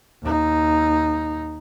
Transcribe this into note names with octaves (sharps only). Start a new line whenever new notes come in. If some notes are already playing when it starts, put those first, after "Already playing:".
D#2 D#4